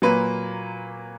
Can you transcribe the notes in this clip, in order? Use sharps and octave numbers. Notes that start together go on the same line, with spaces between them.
A#2 F#3 A#3 B4